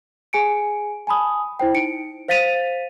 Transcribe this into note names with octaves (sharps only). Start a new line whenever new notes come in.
G#4 G#5 C#7 D7
G#5 A5 B5 D#6
E4 C5 G5
D#4 C#7 D7
C5 F5 A6 B6 D#7 F7